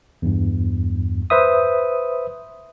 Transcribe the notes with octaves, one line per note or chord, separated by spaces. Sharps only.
E2 G2
B4 C5 E5 D#6